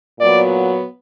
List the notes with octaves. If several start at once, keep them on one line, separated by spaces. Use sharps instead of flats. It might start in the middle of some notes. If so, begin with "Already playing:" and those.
A#2 F#3 B3 D5